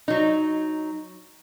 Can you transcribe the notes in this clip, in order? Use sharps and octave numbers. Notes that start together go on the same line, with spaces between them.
F#3 D#4